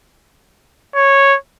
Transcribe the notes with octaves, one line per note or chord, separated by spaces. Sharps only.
C#5